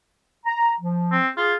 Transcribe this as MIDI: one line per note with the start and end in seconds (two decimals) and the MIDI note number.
0.46 0.73 82
0.81 1.17 53
1.11 1.28 60
1.37 1.54 65
1.37 1.55 68